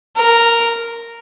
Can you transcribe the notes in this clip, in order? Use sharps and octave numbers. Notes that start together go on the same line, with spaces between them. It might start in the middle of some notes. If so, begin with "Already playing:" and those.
A#4